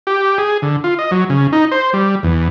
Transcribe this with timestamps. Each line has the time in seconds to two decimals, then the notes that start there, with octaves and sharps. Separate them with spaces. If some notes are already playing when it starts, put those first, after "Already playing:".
0.07 G4
0.38 G#4
0.62 D3
0.84 F4
0.99 D#5
1.11 F#3
1.30 C#3
1.53 D#4
1.72 C5
1.93 G3
2.23 E2